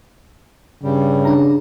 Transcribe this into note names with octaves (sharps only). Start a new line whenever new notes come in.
G2 C#3 G3
D4 A#5